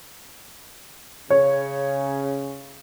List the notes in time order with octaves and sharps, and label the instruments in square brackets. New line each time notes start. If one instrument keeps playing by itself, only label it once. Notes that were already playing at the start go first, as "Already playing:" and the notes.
[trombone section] C#3 [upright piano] C#5